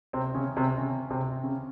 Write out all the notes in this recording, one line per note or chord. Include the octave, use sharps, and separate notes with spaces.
C3 C4
C#3 C#4
C3 C4
C#3 C#4
C3 C4
C#3 C#4